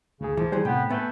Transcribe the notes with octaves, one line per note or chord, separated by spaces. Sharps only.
D2 C#3 G#4
E3 F3
E3 G3 G#4 C5
A2 C3 B3 G5
A3 B3 G#5 F#6 G6